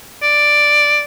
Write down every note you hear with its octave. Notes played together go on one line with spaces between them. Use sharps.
D5